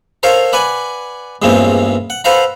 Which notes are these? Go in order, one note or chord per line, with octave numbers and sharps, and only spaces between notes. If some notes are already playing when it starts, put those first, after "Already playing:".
A4 A#4 C5 C#5 F5
B4 D5 F#5 G#5
E2 G2 A#2 G#3 C4 C#4
F#5
A4 B4 C5 F5 F#5 A#5